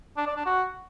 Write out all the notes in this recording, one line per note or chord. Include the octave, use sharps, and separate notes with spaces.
D4
D5
D4
F#4